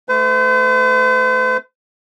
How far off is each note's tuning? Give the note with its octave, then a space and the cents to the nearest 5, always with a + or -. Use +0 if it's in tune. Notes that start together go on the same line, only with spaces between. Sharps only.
A3 +0 C5 -45